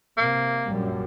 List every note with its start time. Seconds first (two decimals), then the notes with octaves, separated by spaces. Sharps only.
0.18 C3 A#3
0.67 A#1 F#2 G3